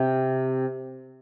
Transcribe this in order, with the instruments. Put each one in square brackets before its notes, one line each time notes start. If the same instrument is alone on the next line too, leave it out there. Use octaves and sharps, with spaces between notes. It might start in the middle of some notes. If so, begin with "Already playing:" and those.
Already playing: [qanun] C3